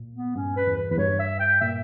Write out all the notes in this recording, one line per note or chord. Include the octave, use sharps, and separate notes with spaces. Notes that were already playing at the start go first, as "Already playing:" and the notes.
Already playing: A#2
B3
G2 C#4
B4
E2
B4
E2 B4
G2 C#5
E5
G5
A#2 E5